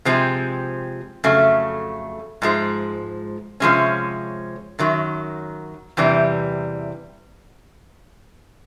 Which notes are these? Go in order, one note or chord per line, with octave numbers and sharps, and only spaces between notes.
C3 F3 G#3 C4
F2 C#3 F#3 A3
G#2 F3 G#3
C3 F3 G#3 C#4
F#2 D#3 F#3
E2 C3 E3 G3